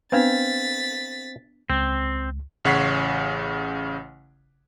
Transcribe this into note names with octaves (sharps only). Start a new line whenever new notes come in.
B3 C4 D4 B4 F5 A6 B6
C#2 C4
A1 C#3 C#5 F#5 B6 C7